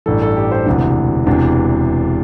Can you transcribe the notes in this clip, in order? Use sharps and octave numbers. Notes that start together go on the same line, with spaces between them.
A1 G2 E3 A4
A4
G4
C5
E1 D2 C3 E3 D4
E1 E2 C3 E3 D4